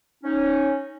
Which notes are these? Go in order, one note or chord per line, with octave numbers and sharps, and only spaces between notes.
C#4 D#4